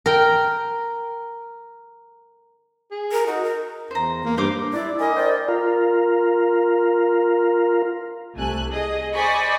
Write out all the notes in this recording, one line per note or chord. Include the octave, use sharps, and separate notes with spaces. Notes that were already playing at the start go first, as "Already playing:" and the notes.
A#4 G5
G#4
A#4
D#4 F#4
A#4
E2 C5 A#5
A#3
G2 D#4 C5 D6
D4 E4 D5
A#4 D#5 G#5 B5
A#4 C5 D5 G5 A5
F4 A#4
C2 A3 G#5 F#6
G#4 D#5
C5 D5 D#5 G#5 B5 C#6